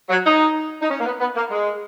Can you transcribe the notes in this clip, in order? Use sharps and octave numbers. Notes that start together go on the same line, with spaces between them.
F#3
D#4
D#4
C#4
A#3
B3
B3
A#3
G#3